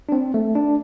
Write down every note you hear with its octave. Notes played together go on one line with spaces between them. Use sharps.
D4
C4
A3
D4